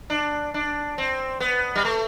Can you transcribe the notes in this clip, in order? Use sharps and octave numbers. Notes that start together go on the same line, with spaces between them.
D4
D4
C4
B3
G3
A3